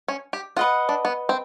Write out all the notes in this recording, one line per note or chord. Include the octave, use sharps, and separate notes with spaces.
C#4
G4
F4 B4 D#5 F#5
D4
B3
C4